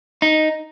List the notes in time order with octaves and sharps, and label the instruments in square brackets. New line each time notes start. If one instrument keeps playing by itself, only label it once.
[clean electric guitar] D#4